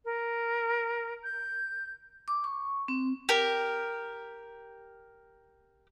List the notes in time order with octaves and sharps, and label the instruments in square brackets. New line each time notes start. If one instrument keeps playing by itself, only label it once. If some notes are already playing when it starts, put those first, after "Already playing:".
[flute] A#4
G6
[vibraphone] D6
C#6
C4
[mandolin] G4 A#4